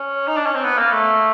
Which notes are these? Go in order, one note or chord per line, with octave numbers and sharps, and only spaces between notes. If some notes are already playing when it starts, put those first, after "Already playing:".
Already playing: C#4
D#4
D4
C#4
C4
B3
A#3
A3